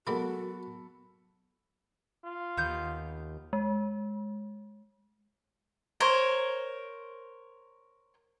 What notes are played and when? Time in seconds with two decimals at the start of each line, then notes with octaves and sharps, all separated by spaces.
0.07 F#3 G#3 A#3 B3 F4 F#4 A4 B5
2.25 F4
2.57 D#2 B3 G6
3.53 G#3
6.00 A#4 C5 C#5